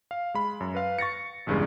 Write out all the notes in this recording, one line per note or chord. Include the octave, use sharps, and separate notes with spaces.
F5
G#3 B5
F#2
B4 F5
C#6 A6 A#6 C#7
A1 E2 G2 C#3 G#3